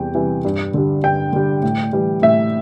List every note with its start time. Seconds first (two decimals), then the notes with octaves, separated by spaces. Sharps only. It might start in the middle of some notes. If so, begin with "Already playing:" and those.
Already playing: E2 C3 E3 G3 G5
0.15 C3 E3 G3
0.45 G2
0.74 D3 G3
1.03 G2 G5
1.33 D3 G3
1.63 A2
1.93 E3 G3
2.22 A2 E5